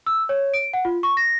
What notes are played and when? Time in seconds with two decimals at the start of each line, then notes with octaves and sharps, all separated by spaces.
0.06 E6
0.29 C#5
0.54 D7
0.73 F#5
0.85 F4
1.03 C#6
1.17 A#6